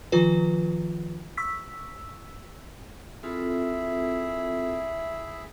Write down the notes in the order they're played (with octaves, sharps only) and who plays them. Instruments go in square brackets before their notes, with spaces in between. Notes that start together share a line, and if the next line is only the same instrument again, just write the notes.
[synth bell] D#3 F3 F4 B4
C#6 E6 B6
[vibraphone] C4 F4 A4 [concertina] E4 G#4 E5